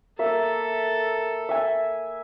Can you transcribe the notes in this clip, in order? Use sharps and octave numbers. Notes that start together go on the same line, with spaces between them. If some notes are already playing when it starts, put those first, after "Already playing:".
A#3 A4 E5 E6
E5 G#5